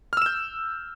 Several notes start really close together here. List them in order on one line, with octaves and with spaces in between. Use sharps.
F6 E6 E7 G6